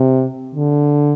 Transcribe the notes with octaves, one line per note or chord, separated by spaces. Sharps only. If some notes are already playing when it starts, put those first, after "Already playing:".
Already playing: C3
D3